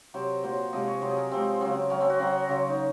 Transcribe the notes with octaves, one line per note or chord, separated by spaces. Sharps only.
C3 F#3 C5
A#2 F#3 C5
C3 F3 G#3 D#5
C#5
C3 F#3 C5
G#4
A#4
C3 F3 G#3 C4
C#3 F#3 C4
C#3 F#3 C#4
C4
F#4
C#3 F#3 C4
C#3 F#3
D#4